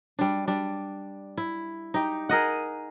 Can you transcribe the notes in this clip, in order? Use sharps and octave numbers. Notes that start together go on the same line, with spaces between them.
G3 D4
G3 D4
E4
D#4 G4
G#4 A#4 D#5 F#5